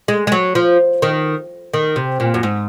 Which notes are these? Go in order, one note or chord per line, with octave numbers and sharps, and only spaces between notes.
G#3
G#3
F#3
F3
D#3
D#3
C3
A#2
F#2
G#2